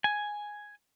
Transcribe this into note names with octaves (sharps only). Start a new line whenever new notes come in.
G#5